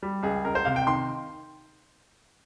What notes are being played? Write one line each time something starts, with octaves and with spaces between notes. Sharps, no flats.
G3
C#2 G#4
C#2 A#4
C5
C3 F5
G5
D#3 C6